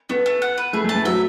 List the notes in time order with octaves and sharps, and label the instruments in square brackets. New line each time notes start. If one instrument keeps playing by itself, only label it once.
[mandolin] A3 [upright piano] B3
[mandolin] A3
F#5
B4
[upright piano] A3 [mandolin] G#4
[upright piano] A3
[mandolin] A5
[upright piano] A3
[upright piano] F#3 [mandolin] E5